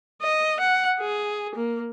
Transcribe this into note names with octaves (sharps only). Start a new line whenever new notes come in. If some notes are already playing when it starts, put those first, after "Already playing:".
D#5
F#5
G#4
A#3